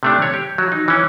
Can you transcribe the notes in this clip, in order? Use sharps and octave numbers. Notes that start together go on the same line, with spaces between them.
C3 A3 D4
C#5
G4
F#3
D#4
E3 C#4